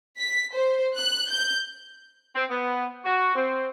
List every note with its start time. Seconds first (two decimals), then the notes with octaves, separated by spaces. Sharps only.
0.19 B6
0.54 C5
0.96 F#6
1.29 G6
2.35 C4
2.49 B3
3.04 F#4
3.35 C4